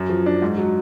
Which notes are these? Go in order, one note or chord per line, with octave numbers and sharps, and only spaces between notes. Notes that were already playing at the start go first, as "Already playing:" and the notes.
Already playing: F#2
F3
D4
G#2
F#3